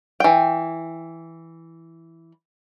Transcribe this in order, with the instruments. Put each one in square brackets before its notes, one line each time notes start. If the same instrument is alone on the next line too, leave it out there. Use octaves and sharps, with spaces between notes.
[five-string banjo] E3 G5